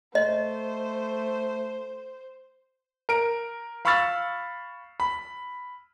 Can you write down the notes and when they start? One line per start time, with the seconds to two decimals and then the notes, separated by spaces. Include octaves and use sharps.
0.15 A3 C5 D#5
3.09 A#4 D7
3.85 F5 B5 C#6 E6 F6 A6
5.00 B5